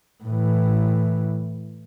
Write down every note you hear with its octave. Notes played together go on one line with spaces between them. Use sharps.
A2 E3